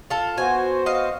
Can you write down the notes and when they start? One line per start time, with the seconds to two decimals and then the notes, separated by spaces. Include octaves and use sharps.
0.10 F4 A4
0.38 B3 F#4 C5 G#5
0.86 D#5 F5